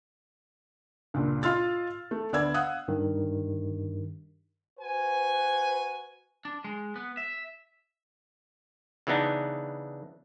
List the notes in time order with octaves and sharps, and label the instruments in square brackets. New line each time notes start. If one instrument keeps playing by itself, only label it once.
[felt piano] C#2 G2 A#2
F4 D#5 C6 E6 F6 A6
A3
D2 B3 D5 E6 G#6
F5 F#5 D#6 F#6
[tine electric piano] G2 D#3
[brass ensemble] F#4 B4 C5 G#5
[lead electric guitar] D4
G#3
B3
E5
[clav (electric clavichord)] C#3 E3 B3 D4 D#4